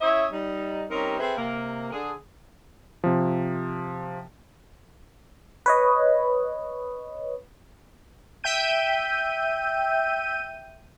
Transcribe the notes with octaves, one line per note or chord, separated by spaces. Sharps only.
C#4 E4 C#5 D#5 E5
G3 D#4
G3 C4 C#4 D#4 G4 A#4
C4 G#4 A4 B4 C5 E5
C3 A#3
D3 G#4
C3 F3
B4 C#5 D#5
E5 G5 G6 D#7